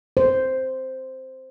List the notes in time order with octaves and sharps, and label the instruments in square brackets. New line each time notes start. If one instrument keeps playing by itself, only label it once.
[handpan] C5